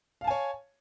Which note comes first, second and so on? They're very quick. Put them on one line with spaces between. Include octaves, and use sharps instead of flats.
F5 A5 G#5 C#5